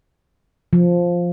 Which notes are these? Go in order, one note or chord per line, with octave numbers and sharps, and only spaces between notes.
F3